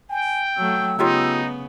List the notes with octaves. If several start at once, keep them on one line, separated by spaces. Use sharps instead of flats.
G5 G#5
F#3 A3 E6
C#3 B3 D#4 F4 G4 C#5